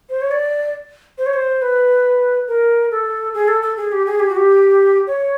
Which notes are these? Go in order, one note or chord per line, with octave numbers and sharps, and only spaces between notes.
C5
C#5
D5
C5
C#5
C5
B4
A#4
A4
G#4
A4
A4
G#4
G4
G#4
G4
F#4
G4
C#5